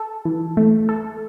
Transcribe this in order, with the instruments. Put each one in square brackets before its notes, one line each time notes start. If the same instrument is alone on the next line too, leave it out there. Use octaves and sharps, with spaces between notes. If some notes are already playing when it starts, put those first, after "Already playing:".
Already playing: [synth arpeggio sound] A4
E3
A3
A4